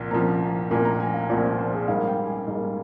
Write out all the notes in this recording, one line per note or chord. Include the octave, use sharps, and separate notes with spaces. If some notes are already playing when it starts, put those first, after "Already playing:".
Already playing: C2 A#2 F3 A#5
C2 A#2 F3 A#5
C2 A#2 F3 G#5
A#5
G#5
F5
C2 A#2 F3 D5
C5
A#4
C5
G#4
G#2 G3 A#3 F5
G5
G#5
G#2 G3 A#3